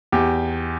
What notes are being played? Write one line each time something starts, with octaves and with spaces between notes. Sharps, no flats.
E2 G4